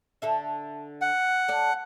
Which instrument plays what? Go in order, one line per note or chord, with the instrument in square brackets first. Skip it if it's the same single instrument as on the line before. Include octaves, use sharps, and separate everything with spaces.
[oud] D3 A4 E5
[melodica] F#5
[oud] A4 D5